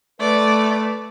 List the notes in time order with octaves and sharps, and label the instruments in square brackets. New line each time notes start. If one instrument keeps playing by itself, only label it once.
[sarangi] A3 [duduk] B4 [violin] D5